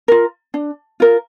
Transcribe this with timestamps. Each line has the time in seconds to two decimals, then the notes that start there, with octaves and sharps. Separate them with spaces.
0.08 F4 A#4
0.54 D4
1.00 F4 A#4